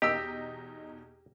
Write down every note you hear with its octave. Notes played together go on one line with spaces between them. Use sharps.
E2 B2 D#4 G4 D#5 E6